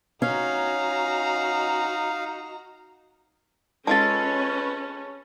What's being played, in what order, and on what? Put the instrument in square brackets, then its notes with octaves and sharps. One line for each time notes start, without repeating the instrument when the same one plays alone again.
[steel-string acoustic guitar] C#4 [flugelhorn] D#4 [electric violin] F#4 A#5 [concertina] F5
[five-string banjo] G#3 F4 A4 [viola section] C#4 [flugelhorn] B4 [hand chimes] A5 A6